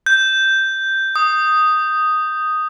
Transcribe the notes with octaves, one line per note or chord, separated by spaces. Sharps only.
G6
D#6